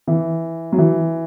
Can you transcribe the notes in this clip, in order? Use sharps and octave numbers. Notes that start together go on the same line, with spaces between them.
E3
F#3
E3